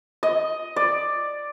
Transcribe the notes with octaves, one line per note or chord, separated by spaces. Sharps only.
D#5
D5